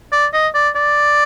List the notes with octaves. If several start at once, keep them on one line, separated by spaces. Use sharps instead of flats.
D5
D#5
D5
D5